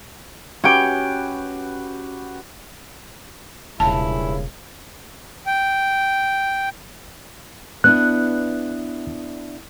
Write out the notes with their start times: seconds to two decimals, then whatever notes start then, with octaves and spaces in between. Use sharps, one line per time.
0.64 C#4 F#4 G4 B4 G5
3.80 E1 G2 A#2 C#3 E4 A5
5.46 G5
7.84 B3 D4 E4 F#6